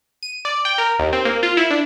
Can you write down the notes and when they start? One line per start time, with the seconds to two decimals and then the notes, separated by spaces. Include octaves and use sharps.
0.23 D#7
0.45 D5
0.65 G5
0.78 A#4
0.99 D#2
1.13 C4
1.25 A#3
1.43 F4
1.57 E4
1.71 D4